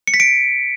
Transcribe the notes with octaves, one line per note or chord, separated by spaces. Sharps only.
C#7
B6
D7